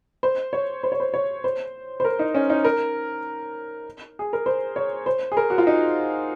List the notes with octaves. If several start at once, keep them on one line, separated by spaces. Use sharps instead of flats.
C5
C#5
C5
C#5
C5
C#5
C5
C5
A#4
D#4
C#4
D#4
A#4
G#4
A#4
C5
C#5
C5
G#4
A#4
F#4
F4
D#4